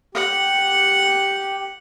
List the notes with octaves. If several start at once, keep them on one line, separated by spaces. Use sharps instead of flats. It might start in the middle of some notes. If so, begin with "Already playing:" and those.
G4 F#5